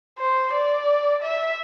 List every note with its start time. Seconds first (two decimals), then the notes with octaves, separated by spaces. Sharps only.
0.18 C5
0.54 D5
1.22 E5